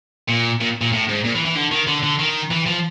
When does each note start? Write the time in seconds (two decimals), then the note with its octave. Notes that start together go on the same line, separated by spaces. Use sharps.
0.29 A#2
0.61 A#2
0.81 A#2
0.92 A2
1.08 G#2
1.24 A#2
1.35 E3
1.45 E3
1.55 D3
1.71 D#3
1.87 D3
2.03 D3
2.19 D#3
2.51 E3
2.67 F3